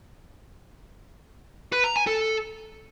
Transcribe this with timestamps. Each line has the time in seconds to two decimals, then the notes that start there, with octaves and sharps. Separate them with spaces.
1.72 B4
1.84 A#5
1.95 G#5
2.07 A4